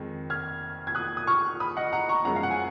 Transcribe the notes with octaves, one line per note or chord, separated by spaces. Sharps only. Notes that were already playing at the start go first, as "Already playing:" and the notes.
Already playing: F2 D#3 G#3
F6 G#6
G#6
D#6 F#6
D#6
C#6 F6
B5 D#6
D#5 F#5
F#5 A#5
A#5 C#6
F#2 F3 G#3 C#4 F#5 A#5
F5
F#5
G#5